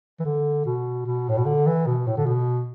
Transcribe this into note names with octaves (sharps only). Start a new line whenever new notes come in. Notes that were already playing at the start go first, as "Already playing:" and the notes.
E3
D3
B2
B2
A2
B2
D3
E3
B2
A2
D3
B2